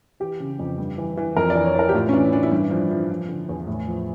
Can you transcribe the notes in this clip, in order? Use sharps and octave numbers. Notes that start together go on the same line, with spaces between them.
E3 G4
C#3
F2
G2
E3
E3
F2 A#4
D5
E3
C#5
E3 A#4
G4
A2 F4
C#4
E3 D4
E4
E3 D4
E4
G2 D4
F3 D4
F3 E4
F3
D3
E2
A2
F3